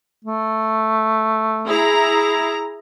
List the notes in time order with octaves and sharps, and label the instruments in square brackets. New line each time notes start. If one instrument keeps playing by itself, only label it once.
[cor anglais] A3
[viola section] E4 G#4 A#5